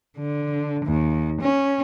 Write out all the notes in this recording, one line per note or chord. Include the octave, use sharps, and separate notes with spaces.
D3
D#2
C#4